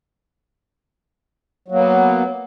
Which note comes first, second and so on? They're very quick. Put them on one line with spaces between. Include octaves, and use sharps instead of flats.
F#3 A#3 B3